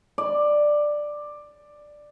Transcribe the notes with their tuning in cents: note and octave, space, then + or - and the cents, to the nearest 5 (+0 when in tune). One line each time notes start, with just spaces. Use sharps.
D5 +10